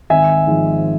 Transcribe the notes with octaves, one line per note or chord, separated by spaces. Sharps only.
G#1 E5 G#5
G#2 F3